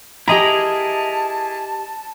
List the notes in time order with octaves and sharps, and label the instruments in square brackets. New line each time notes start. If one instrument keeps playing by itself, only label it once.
[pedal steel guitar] E4 G#4 A#4 [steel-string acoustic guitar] G4 D#5 A#5 [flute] A5